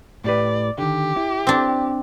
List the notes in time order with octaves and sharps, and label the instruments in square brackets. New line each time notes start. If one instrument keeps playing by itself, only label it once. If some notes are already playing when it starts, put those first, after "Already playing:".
[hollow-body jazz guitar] A2 G4 B4 [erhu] D5
[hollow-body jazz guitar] D3 D#3 [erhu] G4
[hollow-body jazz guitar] E4
[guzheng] C4 D4